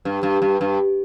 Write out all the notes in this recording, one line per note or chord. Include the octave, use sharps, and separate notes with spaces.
G2
G2
G2
G2